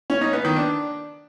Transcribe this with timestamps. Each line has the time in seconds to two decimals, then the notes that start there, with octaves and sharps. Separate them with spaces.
0.10 C#4
0.21 D#4
0.33 B3
0.45 D#3
0.56 D4